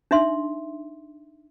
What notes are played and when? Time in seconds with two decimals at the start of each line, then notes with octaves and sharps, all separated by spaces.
0.11 D4 D#4 E5 C6